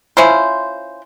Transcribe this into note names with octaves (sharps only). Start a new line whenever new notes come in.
C#4 E4 F4 C5